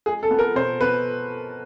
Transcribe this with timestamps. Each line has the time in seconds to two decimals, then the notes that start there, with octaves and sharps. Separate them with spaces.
0.06 G#3 G#4
0.23 A4
0.31 B3
0.39 A#4
0.55 B2 C5
0.81 B2 B4